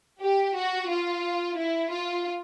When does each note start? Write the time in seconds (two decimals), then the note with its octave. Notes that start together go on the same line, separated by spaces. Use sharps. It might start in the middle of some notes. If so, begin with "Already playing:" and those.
0.21 G4
0.55 F#4
0.89 F4
1.57 E4
1.91 F4